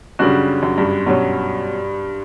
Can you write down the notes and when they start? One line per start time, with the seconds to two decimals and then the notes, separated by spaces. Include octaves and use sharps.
0.19 F#2 C#3 G3 D4 F#4
0.63 F#2
0.78 G2
1.07 G2 B2 F#3 C#4